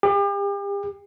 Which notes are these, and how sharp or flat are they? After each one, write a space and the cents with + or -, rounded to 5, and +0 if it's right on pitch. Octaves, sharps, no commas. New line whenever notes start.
G4 +40